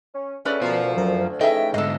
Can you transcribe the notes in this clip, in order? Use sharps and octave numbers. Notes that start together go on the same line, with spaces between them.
C#4
C#3 F#3 A3 C#4 B4 D5
D2 B2 F4 A#4 C5
F#2 A#4
C#3 E3 F3 A3 D#4 D#5 E5 G5
G#2 D3 A4 D#5